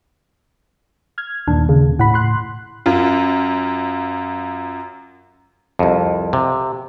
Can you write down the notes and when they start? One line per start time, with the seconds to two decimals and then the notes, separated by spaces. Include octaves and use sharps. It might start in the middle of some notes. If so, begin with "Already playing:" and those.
1.18 F6 G#6
1.48 D#2 A#2 D#3 D4
1.69 C#3
1.99 A2 F#5 B5
2.14 C6 F#6
2.86 F#2 F4
5.79 C2 F2
6.33 C3